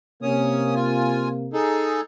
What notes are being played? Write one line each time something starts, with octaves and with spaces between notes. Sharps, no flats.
C3 A#3 C#4 C#5 D#6
F4 G#5
D#4 G#4 A4